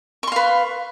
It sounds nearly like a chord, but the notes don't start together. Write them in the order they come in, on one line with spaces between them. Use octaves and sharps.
C#6 C6 F5 B4